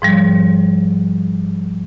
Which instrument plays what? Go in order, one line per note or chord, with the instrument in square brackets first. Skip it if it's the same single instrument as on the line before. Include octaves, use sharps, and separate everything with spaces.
[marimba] G#2 F3 G3